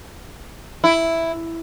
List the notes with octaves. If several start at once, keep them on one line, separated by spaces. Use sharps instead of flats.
E4